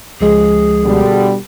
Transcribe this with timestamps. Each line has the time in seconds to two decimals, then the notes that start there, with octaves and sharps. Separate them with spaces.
0.21 C#2 F3 G#3 G#4
0.84 B2 D3 G3